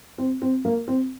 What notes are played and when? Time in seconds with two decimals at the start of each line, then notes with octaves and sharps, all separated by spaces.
0.18 C4
0.42 C4
0.65 A#3
0.88 C4